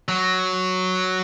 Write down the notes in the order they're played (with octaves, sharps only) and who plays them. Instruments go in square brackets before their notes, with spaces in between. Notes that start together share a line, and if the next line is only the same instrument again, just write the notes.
[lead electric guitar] F#3